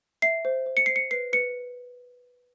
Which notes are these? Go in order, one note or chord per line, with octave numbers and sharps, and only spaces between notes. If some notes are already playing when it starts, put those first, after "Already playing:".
E5 C7
C5
C5
C#7
C5 C7
C#7
B4 C7
B4 C#7